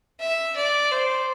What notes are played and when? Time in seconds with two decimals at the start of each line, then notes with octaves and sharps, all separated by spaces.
0.20 E5
0.56 D5
0.91 C5